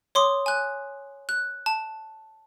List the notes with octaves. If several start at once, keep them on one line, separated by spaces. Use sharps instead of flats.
C#5 C6 D6 D#6
G#5 F#6
F#6
A5